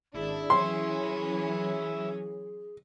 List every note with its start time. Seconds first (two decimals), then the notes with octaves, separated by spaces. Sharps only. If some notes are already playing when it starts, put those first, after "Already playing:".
0.15 G#1 D4 E4 G#4
0.50 E3 F#3 C#4 C6